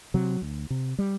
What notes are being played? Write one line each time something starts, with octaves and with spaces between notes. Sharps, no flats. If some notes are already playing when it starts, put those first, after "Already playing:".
C3 F#3
D2
C3
G3